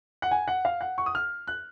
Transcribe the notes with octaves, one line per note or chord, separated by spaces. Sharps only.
F#5
G#5
F#5
F5
F#5
C#6
D#6
F6
F#6